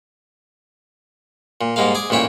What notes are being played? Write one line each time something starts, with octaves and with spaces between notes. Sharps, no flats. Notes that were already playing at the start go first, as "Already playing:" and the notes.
A#2
G#2 G3 G#3 A#3 F5
G#4 G#5 D6
A1 A#2 E4 C#5 G5